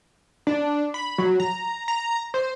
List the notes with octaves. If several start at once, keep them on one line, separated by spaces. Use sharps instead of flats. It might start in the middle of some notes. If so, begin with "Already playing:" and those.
D4
B5
F#3
A#5
A#5
C5